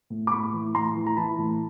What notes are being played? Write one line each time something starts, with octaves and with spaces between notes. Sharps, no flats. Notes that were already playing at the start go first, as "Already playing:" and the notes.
A2
D6
A2 B5 C#6
E3
A2 A#5 C6
E3
A#5
E3 A5 B5
A2